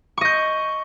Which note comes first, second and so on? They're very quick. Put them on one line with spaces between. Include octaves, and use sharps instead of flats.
C#6 D#5 G6